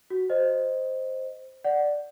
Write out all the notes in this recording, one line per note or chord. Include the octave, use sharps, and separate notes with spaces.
F#4
C5 D#5
D5 F#5